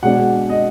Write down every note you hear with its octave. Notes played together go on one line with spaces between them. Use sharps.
B2 G#3 D4 F#5
D#5